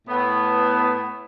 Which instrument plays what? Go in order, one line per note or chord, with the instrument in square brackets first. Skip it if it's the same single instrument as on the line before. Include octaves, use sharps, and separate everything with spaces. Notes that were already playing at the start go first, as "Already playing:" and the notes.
[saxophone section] A2 B3